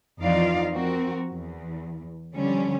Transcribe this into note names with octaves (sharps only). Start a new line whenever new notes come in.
F2 E3 D#4 F4 D5 F5
F3 C4 F#4 A#4
E2
D3 F3 G3 C#4